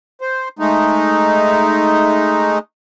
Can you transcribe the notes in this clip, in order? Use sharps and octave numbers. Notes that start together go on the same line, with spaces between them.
C5
G#3 A3 D#4